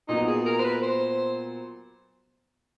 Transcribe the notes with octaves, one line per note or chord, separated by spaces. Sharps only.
A#2 F#3 B3 D#4
G#4
A#4
C5
B4
C5